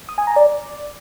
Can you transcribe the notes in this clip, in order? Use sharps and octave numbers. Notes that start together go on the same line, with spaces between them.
D#6
G#5
A#5
D5